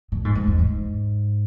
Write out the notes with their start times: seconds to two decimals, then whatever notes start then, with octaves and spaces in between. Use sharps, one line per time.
0.12 A#2
0.25 G#2
0.35 G#2
0.47 E2
0.59 G#2